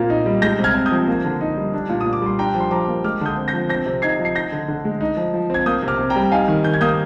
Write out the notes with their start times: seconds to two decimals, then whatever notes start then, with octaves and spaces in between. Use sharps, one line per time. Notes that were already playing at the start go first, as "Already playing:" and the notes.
Already playing: A#2 A#3 C4
0.10 D#4
0.26 G3
0.42 G#3 G6 A#6
0.59 C3
0.64 F6 G#6
0.74 C4
0.86 D#6 G6
0.92 F3
1.07 A#3
1.25 D3
1.41 D#4
1.57 G3
1.74 D4
1.89 A#2
2.01 A#2 D#6
2.13 D6
2.22 G3 C6
2.39 D4 G5 A#5
2.55 F3
2.60 C6
2.71 F3 A#5 D6
2.88 A#3
3.04 G#3 D6 F6
3.21 D3 D#6 G6
3.37 C4
3.48 G6 A#6
3.53 F3
3.69 C4 G6 A#6
3.86 C3
4.02 D#4 G#6 C7
4.19 F3
4.25 C7
4.35 D#4 G6 A#6
4.52 D3
4.68 D3
4.85 G#3
5.01 D#4
5.17 F3
5.34 F3
5.50 C4 G#6
5.66 A#3 D#6 G6
5.83 C3
5.88 D6 F6
5.99 C3
6.10 G5 A#5
6.16 G3
6.32 D#4 F5 G#5
6.48 D#3
6.64 D#3 G6
6.74 G#6
6.81 A#3 D#6 G6